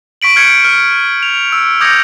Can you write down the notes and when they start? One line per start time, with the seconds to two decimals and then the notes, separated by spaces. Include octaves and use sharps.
0.22 C#6 B6 D7 F#7
0.36 F6 G6 G#6 C#7
0.65 F6
1.23 F7
1.52 E6
1.81 D6 D#6 G6 G#6 A#6 C#7